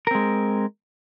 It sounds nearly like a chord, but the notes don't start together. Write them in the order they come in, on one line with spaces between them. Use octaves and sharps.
A#4 C4 G#3